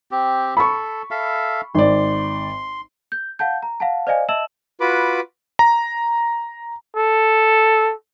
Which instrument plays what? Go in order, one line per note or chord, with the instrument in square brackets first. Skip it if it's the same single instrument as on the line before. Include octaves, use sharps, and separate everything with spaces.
[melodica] C4 G4
[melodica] A4 [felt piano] B5 C#6
[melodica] A4 E5 F5
[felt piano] G#1 D5 [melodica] C6
[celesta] G6
F5 F#5 A5 G6
A#5
F5 F#5 A5
C5 D5 D#5 F5 G#5
D#5 E5 A5 E6 E7 F#7
[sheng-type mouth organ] F4 F#4 B4 B5 D6
[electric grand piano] A#5
[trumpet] A4